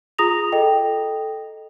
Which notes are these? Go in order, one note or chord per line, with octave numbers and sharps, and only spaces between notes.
F4 G#4 A#5 D#6 A#6 F7
A4 D#5 G5